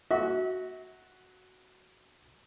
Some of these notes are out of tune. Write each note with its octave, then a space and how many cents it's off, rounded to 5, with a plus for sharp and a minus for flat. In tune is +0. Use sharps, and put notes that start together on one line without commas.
F#4 +0 E5 -35